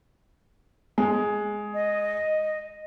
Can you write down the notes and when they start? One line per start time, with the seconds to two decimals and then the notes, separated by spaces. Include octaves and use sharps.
0.98 G#3
1.74 D#5